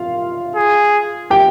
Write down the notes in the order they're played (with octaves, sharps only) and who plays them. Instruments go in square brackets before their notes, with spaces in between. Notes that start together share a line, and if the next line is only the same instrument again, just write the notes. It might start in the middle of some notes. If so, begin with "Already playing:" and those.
Already playing: [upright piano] F4 F5
[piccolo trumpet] G#4
[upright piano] G4 G5